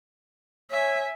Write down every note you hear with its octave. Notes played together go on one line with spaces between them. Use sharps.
C#5 E5 G#5